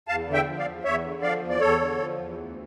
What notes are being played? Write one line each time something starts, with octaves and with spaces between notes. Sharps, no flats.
E2 F5 A5
D3
E5 G5
F3
D5 F5
E2
E2 C#5 E5
D3
F3 D5 F5
E2
D5
E2 A4 C#5
D3
F3
E2
D2